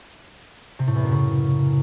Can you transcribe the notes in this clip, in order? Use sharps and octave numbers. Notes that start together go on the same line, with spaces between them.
C3
A2
E2
F#2
C#3